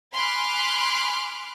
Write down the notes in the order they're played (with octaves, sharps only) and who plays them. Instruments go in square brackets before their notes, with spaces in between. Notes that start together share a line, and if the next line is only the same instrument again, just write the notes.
[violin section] G#5 B5 C6 D6 F6 F#6